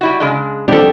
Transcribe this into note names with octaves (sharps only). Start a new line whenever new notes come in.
G3 E4 F#4
C#3 G#3 D4
B2 F3 G3 C4 D4 G4 A4